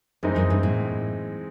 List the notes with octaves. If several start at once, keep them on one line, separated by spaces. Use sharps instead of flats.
F#2 E3 G#3 C4 D#4
F#2
G2
A2